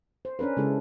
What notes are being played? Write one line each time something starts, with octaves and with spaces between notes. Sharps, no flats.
C5
C#4 D4 A#4 B4
C#3 G#3 E4 A4